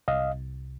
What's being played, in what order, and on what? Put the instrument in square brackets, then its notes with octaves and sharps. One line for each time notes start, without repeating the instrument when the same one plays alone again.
[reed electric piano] C2 D#5 F5